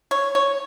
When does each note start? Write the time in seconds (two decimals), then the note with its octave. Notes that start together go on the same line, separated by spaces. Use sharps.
0.11 C#5
0.35 C#5